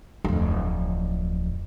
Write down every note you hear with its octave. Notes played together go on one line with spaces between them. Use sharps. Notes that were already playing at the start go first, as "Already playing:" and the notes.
D1 F2